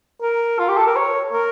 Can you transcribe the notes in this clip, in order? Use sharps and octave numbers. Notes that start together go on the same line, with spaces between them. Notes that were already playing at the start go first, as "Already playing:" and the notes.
A#4
F4
G4
A4
A#4
C#5
A#4